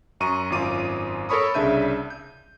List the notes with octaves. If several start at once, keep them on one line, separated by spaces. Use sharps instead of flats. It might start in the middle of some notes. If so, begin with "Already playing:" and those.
F#2 A#5 C#6 D#7
G#1 F#2 F4 D6 D#7
A4 A#4 C#5 B5 C#6 D#6
C2 C#3 D4 E5 G6 D#7
G6